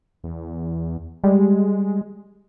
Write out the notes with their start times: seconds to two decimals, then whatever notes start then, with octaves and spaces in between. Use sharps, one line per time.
0.24 E2
1.24 G3 G#3